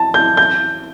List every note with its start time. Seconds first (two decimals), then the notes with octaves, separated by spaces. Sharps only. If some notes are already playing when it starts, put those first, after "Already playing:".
Already playing: A5
0.14 G6
0.37 G6